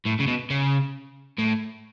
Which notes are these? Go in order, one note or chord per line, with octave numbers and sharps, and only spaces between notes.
A2
C#3
B2
C#3
A2